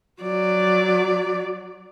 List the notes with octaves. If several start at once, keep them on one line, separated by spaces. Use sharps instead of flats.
F#3 D5